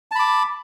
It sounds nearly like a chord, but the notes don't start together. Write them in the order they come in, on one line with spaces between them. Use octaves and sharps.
A5 B5 D6